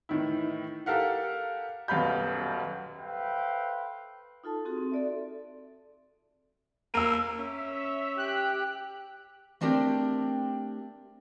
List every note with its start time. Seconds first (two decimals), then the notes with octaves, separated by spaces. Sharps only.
0.09 A2 D#3 E3 E4
0.86 G4 A4 A#4 F5 F#5
1.88 D#1 F#2 B2 F5 B5 G6
2.98 A4 B4 C5 E5 F5 G5
4.44 D#4 F4 A4 A5
4.65 C4 D#4 F#4 G#4 A4
4.78 C4
4.92 A4 D5 E5
6.94 A#3 E6 D#7
7.39 C#4 E5
8.17 G4 G5 F#6
9.61 A3 C4 D4 G4 A#4 G5